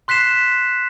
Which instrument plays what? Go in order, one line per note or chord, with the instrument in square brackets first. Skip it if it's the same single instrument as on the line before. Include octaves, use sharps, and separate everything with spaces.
[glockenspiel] C6 F#6 B6 C7 E7